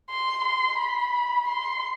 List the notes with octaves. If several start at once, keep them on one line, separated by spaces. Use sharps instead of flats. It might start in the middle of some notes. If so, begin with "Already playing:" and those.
C6
C6
B5
C6